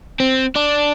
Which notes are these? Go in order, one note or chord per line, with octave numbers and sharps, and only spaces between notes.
C4
D4